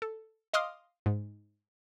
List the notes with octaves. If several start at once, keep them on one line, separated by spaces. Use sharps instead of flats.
A4
D#5 F5 C6 D6 D#6 F6
G#2